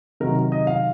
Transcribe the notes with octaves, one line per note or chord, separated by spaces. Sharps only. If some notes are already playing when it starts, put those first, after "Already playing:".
C3 D#3 F#3 A#4
D#5
F5